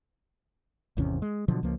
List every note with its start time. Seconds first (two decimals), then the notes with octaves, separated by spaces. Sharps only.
0.97 G#1 E2 C3 C#4
1.22 G#3
1.48 B2 D3 F3 F#3
1.63 C#2 F3 A#3